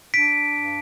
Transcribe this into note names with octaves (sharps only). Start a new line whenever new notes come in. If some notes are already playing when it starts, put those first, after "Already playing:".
D4 B6 D7
G2